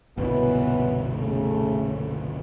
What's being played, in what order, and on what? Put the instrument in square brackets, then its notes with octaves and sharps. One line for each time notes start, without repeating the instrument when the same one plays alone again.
[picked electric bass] G1 C2 B2 [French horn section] E3 F#3 B3
[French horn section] C#3 A3